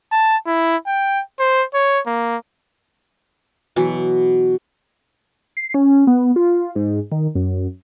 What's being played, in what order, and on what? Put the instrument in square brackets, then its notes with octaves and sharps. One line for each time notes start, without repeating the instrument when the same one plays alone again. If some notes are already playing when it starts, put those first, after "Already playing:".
[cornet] A5
E4
G5
C5
C#5
A#3
[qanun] B2 E3 F#3
[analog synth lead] C7
C#4
B3
F4
G#2
D#3
F#2